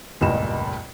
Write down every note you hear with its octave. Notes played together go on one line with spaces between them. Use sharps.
F1 C#2 G2 A#2 D#5 E7